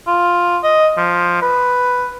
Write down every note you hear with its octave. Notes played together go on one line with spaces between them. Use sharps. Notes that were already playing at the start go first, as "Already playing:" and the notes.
F4
D#5
F3
B4